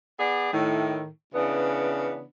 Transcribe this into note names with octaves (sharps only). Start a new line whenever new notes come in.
B3 G#4 D5
A2 D#3
C#3 E3 B3 D4